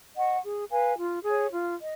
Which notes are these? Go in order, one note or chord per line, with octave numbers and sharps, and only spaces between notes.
D#5 F#5 C#6
G#4
B4 F5 G#5
F4
G#4 C#5
F4
D#5